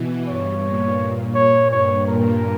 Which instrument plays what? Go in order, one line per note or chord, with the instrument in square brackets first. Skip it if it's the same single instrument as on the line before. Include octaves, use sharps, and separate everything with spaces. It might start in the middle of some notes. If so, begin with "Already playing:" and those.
Already playing: [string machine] B2 E3
[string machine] G2 [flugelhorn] C#5
[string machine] A#2
[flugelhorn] C#5
[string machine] G2 [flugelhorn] C#5
[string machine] A#2 [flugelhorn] A#4